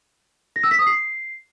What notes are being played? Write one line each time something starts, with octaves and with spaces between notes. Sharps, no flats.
A#6
E6
B6
D#6
C7